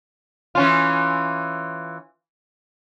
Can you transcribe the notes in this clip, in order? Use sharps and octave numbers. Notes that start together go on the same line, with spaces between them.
E3 C#4 F4